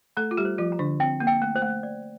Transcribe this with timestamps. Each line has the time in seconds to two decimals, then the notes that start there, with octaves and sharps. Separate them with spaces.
0.17 A3 A4 A#5
0.31 F4
0.37 G3 G4
0.45 C5
0.58 F3 F4
0.72 A#5
0.79 D3 D4
1.00 C4 G5
1.20 A#3
1.27 G5
1.42 A3
1.55 C5
1.62 A3
1.83 D5